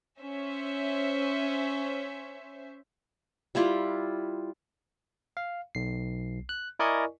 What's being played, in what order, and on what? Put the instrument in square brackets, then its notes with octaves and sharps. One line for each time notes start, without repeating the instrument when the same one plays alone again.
[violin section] C#4 C5 E5
[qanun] G3 E4 F4 G4
[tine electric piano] F5
B1 C7
F#6
E4 A#4 D5 D#5 G#5 C#6